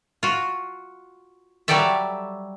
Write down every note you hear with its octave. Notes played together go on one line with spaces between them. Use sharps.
F4 F#4
F#3 G3 G4 A4 D5 E5